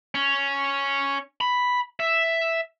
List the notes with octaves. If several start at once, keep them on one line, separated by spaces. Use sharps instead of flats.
C#4
B5
E5